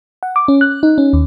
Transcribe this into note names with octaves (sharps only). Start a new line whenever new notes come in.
F#5
D6
C#4
F#6
D#4
C#4
D#2